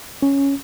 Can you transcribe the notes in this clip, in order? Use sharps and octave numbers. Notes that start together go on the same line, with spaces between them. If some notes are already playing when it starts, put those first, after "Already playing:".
C#4